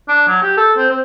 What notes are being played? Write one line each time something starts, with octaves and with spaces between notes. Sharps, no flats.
D4
F#3
G4
A4
C4
C4